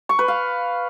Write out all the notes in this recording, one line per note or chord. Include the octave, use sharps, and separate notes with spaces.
C#6
B4
F5